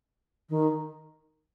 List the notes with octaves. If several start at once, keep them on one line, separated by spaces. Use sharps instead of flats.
D#3